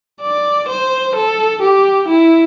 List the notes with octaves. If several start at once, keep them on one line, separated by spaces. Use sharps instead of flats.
D5
C5
A4
G4
E4